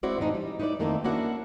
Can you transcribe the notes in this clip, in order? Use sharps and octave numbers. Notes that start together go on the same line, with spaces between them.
G#3 C4 E4 F#4 C5 D5
F2 A2 E3 D4 D#4
G3
D#4 E4 B4 C5 D5
F2 D#3 A3 A#3 C4
A#3 C#4 D4 E4 F#4 F#5